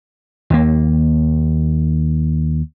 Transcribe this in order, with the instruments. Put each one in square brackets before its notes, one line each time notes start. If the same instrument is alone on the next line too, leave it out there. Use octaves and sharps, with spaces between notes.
[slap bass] D#2 A#3